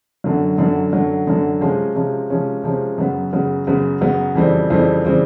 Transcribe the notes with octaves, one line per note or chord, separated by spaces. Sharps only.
F#2 D3 F#3
F#2 D3 F#3
F#2 D3 F#3
F#2 D3 F#3
C3 F3 G#3 C#4
C3 F3 G#3 C#4
C3 F3 G#3 C#4
C3 F3 G#3 C#4
F#2 C#3 F#3 B3
F#2 C#3 F#3 B3
F#2 C#3 F#3 B3
F#2 C#3 F#3 B3
F2 C#3 E3 G3 C4
F2 C#3 E3 G3 C4
C#3 E3 G3 C4